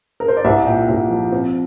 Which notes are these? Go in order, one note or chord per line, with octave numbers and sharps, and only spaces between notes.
A#4
C5
D5
C2 E5
A#2 G5
C2
F3
C4